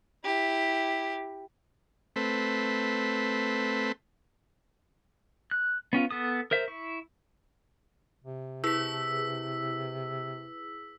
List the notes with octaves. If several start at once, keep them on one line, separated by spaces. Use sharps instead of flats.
E4 G4
A3 C4 B4
F#6
B3 C#4 F4
B3 A4 D#6
A#4 C5 E5
E4 C#6
C3
E4 G#4 B4 E6 B6